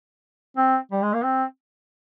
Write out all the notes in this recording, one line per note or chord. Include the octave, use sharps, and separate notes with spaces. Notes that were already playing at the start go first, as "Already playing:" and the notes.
C4
G3
G#3
A#3
C4